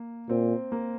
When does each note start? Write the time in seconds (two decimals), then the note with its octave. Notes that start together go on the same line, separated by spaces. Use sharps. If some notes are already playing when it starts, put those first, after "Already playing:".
Already playing: A#3
0.29 A#2 C4
0.72 A#3